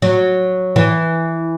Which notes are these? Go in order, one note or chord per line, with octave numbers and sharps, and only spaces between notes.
F#3
E3